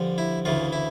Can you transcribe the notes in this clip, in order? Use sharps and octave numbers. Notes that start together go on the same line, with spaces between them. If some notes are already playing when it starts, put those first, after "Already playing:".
Already playing: G2 D3 F3
E4
D2 C#3 E3 F4
E4